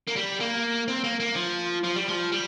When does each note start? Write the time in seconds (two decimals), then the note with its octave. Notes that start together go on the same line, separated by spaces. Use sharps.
0.08 A#3
0.17 G3
0.41 A#3
0.88 C4
1.04 A#3
1.20 A#3
1.35 F3
1.84 F3
1.95 G3
2.08 F3
2.32 G3